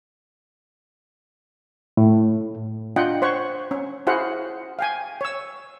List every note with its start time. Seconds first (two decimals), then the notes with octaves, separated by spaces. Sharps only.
1.97 A2
2.96 D4 F4 D#5 F#5 G5
3.22 C5 C#5 F#5 C#6
3.71 C#4
4.07 E4 F#4 G#4 C5 F5 F#5
4.79 F5 G5 G#5
5.21 C#5 E6